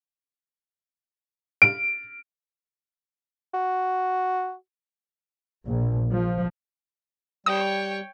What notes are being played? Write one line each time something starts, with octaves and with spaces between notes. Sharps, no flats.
D7
F#4
A#1
F3
G3 C#5 G5 D#6